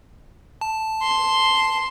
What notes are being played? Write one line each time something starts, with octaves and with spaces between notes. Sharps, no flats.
A5
C6